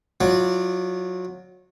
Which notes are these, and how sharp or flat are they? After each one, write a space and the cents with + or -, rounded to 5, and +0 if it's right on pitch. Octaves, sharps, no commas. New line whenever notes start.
F#3 -25 F4 -30 D5 +0